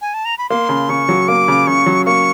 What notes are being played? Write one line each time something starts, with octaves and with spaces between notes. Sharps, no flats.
G#5
A5
A#5
B5
A#3 C6
C#3
C#3 C#6
F#3
A#3 D6
C#3
C#3 C#6
F#3
A#3 C#6